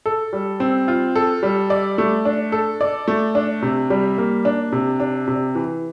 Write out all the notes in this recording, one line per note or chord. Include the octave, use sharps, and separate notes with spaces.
A4
G3
C4
F4
A4
G3
D5
A3
D4
A4
D5
A3
D4
C3
G3
A#3
D4
C3
D4
C3
E3